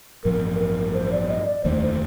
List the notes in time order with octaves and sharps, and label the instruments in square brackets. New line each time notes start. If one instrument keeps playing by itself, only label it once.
[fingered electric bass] A1 G2 F3 [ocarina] A#4
[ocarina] A#4
C5
D5
D#5
D5
[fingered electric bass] F1 D#2 D3 A3 [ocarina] C5
[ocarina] C5